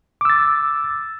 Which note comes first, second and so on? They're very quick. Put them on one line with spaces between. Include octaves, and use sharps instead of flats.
D6 E6 A6